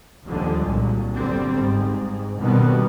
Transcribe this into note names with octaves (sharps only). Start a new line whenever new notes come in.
D#2 D3 F3 G3 G#3
C2 A#2 F#3
G1 D3 G3 C4
G#2
B2 D3 D#3 G3 B3 C4